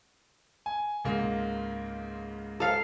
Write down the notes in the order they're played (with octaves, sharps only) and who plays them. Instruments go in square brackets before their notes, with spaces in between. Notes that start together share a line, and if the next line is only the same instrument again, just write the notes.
[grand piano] G#5
C#2 G#2 A#3
[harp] A4 F5